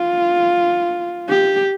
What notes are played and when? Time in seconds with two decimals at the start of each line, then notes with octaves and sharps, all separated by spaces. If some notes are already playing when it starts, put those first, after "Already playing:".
Already playing: F4
1.28 G4